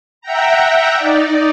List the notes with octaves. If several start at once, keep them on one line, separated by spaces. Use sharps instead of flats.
E5 F#5 G5 A#5
D#4 D5